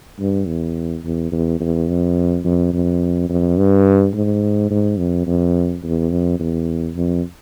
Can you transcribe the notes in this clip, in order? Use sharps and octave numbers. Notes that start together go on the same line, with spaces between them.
G2
E2
E2
E2
E2
F2
F2
F2
F2
G2
G#2
G#2
F2
F2
E2
F2
E2
F2